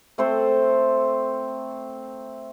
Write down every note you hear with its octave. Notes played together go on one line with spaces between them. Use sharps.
A3 C4 A4 C5